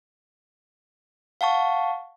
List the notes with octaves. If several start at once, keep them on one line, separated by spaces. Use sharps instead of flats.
F5 F#5 A5 C#6